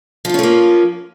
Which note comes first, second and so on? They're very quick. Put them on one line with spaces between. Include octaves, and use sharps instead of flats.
F3 F4 C#4 A3 A#3